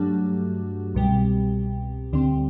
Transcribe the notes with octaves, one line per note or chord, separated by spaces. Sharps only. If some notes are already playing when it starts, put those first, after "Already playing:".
Already playing: G2 F#3 A3 D4 F#4
C2 B2 G3
D2 D3 G3 C4